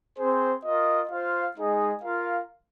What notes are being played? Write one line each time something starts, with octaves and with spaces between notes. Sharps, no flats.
C4 G#4 C5
F4 A#4 D#5
F4 C5 F5
G#3 D#4 G#4 D#5
F4 A#4 F5